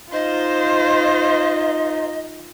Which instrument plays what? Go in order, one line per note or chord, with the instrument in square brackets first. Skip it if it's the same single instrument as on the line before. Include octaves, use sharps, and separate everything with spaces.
[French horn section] D#4 [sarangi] F4 [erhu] C5 [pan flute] D#5